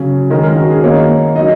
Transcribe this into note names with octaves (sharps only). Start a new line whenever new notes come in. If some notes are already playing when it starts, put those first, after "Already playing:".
Already playing: C#3 F#3 C#4
D#3 G#3 C#4 A#4
A#4
F#4
G#4
D#3 A#3 D#4 C#5
F#3 D#4 D#5